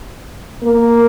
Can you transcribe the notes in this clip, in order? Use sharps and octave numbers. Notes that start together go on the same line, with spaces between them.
A#3